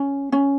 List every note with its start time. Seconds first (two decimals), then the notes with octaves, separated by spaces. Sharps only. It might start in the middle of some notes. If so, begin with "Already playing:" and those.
Already playing: C#4
0.32 C#4